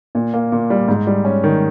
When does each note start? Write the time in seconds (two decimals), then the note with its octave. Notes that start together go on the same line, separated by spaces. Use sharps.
0.15 A#2
0.34 A#3
0.52 A#2
0.70 G3
0.88 G#2
1.07 G3
1.25 C#4
1.44 D#3